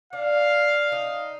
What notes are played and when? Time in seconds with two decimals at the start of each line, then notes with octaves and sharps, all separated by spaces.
0.13 D4 F5
0.92 D#4